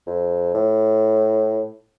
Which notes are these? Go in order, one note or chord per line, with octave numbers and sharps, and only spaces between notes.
F2
A2